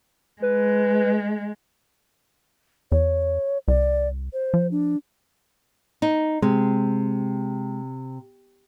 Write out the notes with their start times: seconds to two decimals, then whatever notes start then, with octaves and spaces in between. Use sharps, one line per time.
0.42 G#3 B4
2.92 E2 C#5
3.68 C2 D5
4.33 C5
4.54 F3
4.71 D4
6.02 D#4
6.42 C3 G#3